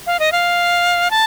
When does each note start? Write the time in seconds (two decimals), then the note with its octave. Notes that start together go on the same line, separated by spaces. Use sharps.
0.07 F5
0.20 D#5
0.32 F5
1.11 A5